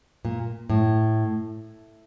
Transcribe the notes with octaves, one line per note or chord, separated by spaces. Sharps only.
A#2
A2